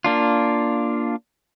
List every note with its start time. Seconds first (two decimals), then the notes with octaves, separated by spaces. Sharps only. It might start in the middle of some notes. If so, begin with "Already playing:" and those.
0.04 A#3 D4 F4